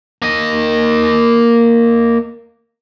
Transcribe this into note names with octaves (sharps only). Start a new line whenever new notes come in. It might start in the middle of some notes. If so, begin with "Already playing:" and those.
A#3 D#5